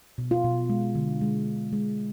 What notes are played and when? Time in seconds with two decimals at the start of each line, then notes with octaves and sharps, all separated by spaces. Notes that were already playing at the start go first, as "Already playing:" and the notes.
0.18 B2
0.31 F4
0.44 B2
0.69 G#3
0.95 D3
1.21 G#3
1.47 D3
1.73 G#3